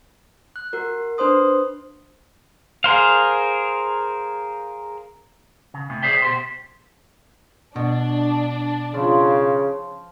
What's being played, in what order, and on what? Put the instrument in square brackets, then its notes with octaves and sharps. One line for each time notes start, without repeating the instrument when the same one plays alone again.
[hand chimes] F#6
F#4 A#4
D4 B4 C5 C6 D#6
[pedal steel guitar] G#4 A#4 C5 F5
[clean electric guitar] C#3
A2 C3
G#4 C5 D5 E5 G5
B2 G4 C5
[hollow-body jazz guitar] B2 [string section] D4
[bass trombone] C#3 [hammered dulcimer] F3